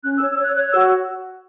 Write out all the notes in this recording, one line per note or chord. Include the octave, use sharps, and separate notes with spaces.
C#4 F#6
E6
C#5
E6
C#5 F#6
C#5 F#6
F#4 E6